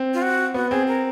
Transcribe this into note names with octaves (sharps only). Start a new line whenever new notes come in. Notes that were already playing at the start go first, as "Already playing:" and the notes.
Already playing: C4
F4
F#4
B3 F#4
C4 G#4
A#4